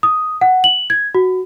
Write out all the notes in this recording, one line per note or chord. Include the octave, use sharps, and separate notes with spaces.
D#6
F#5
F#7
G#6
F#4